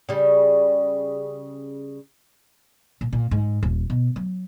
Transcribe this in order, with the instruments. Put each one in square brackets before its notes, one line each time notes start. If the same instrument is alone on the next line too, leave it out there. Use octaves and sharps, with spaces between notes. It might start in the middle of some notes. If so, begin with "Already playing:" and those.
[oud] C#3 G3
[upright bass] A#2
A#2
G#2
D#1
B2
F#3